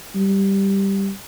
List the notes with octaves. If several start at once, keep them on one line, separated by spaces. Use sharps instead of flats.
G3